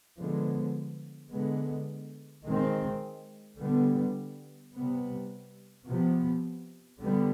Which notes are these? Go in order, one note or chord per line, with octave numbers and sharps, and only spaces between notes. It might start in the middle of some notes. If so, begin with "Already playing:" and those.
D3 F3 G#3 B3
D3 G#3 B3
D#3 G#3 C4
D3 G3 B3
C3 G3 B3
C3 F3 B3
D3 G3 B3